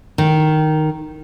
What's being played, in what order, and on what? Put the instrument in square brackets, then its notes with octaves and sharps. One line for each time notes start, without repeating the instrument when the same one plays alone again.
[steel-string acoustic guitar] D#3